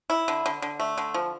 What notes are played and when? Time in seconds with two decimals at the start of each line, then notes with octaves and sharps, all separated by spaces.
0.10 E4
0.28 D3
0.46 D3
0.62 D3
0.80 A3
0.98 D3
1.14 F3